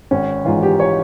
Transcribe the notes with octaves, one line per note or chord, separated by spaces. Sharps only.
G#1 C#4
G#2 E3 F4
G4
C#5